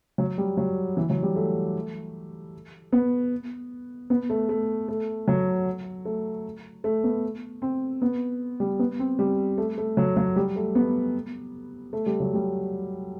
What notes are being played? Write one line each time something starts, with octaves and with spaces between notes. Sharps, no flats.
F#3
G3
F#3
E3
F#3
G3
A3
B3
B3
A3
A3
A3
F#3
A3
A3
B3
C4
B3
G3
B3
C4
G3
A3
A3
F#3
F#3
G3
A3
B3
A3
G3
F#3
G3